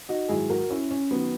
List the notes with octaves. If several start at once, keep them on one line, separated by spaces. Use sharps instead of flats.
D#4 F#4
G#2 D#3 F#3 E4 G#4
F#4 A#4
C#4 E4
C#4
D#3 F#3 B3